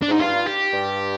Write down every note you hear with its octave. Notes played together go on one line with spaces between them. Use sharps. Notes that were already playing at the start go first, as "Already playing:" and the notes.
D4
G#2 D#4
G2 F4
G4
G2